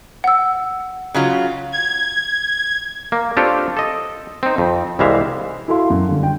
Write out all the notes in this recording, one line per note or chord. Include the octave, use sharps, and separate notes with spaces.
F#5 E6
C#3 F#3 F4
G#6
A#3
C4 D4 F4 G4 A4 C#5
A4 D#5
C4 D#4
F2
C2 E3 G3 G#3 E5 F5
E4 F#4 A4 E5 F5 C6
F#2
D3 G3
G5